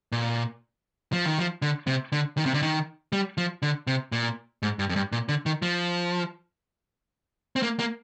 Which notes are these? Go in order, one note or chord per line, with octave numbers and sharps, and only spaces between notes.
A#2
F3
D#3
F3
D3
C3
D3
D#3
C3
D3
D#3
G3
F3
D3
C3
A#2
G#2
G2
F2
G2
A#2
D3
D#3
F3
C4
A#3
A#3